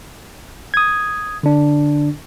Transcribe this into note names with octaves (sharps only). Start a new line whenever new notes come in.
D#6 G#6
D3 D4